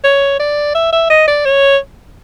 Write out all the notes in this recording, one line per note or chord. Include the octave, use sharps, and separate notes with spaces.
C#5
D5
E5
E5
D#5
D5
C#5